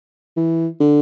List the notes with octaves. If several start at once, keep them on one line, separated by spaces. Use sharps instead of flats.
E3
D3